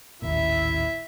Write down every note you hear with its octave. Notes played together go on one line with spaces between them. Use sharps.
A1 D#2 A#2 E4 E5